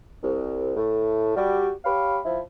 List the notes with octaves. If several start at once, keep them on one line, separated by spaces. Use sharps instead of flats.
C2
A2 A3
G3 F#4
G4 C#5 F5 B5
F3 E4